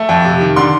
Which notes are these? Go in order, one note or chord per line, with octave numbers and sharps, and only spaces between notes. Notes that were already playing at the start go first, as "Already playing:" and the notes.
Already playing: A3
F2
C3
D#3
D3 C6